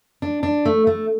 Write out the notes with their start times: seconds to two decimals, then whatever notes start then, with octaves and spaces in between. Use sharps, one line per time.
0.22 D4
0.43 D4
0.66 A3
0.87 A3